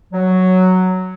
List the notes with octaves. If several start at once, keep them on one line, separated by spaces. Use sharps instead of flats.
F#3